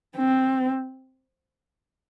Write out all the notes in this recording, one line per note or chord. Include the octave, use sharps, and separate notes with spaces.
C4